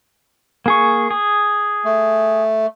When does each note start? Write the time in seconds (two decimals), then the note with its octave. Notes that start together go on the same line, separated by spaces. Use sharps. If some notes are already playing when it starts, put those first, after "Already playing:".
0.66 A#3 G#4 C#6
1.11 G#4
1.85 A3